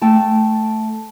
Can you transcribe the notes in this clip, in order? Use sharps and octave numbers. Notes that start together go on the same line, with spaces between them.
A3 G5 A5